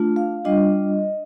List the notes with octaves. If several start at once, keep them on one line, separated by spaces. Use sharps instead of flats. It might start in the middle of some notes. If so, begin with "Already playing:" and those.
Already playing: A3 D4 F4
F5
G3 D4 F4 D#5